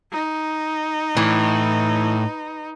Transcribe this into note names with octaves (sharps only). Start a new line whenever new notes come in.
D#4
A2 E3